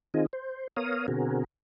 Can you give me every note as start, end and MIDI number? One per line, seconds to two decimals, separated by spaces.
0.14 0.26 51
0.14 0.26 60
0.14 0.26 63
0.14 0.26 65
0.14 0.26 68
0.14 0.26 75
0.33 0.67 72
0.77 1.06 59
0.77 1.06 70
0.77 1.06 73
0.77 1.06 77
0.77 1.06 87
1.08 1.44 47
1.08 1.44 50
1.08 1.44 60
1.08 1.44 66
1.08 1.44 68
1.08 1.44 70